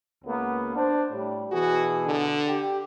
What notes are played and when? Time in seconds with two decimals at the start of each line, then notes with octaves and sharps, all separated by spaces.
0.25 C#2 A#3 B3
0.76 D4 C5
1.12 A2 G3
1.52 B2 E3 F#4 G#4
2.07 D3
2.46 G4